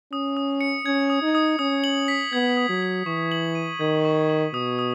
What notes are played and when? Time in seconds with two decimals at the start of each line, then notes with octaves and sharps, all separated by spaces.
0.12 C#4 D#6
0.37 D#6
0.61 C#7
0.85 C#4 G#6
1.10 D#6
1.22 D#4
1.35 D#6
1.59 C#4 D#6
1.84 F#7
2.08 B6
2.33 B3 G#6
2.57 D#6
2.69 F#3
2.82 F#7
3.06 E3 C#6
3.32 F#7
3.55 D#7
3.80 D#3 G#6
4.05 C#6
4.29 F#7
4.54 B2 D#6
4.79 D#6